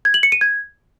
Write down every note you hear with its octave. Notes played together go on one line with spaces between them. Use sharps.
G#6
F#7
C#7
D#7
G#6